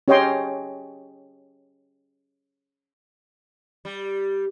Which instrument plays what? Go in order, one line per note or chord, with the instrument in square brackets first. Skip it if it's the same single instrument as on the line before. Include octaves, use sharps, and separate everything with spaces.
[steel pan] C#4 G4 C#5 D#5 G5 C6
[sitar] G3